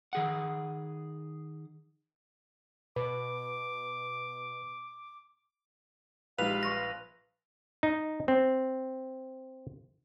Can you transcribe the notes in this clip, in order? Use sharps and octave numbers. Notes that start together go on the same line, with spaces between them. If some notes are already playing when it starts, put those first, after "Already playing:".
D#3 G#4 F#5
B2 B4 D6
A#1 G3 G#3 D#4 B4 F5 F7
C6 C#6 A#6
D#4
C4